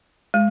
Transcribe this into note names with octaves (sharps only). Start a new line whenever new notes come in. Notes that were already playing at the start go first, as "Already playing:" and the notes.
G#3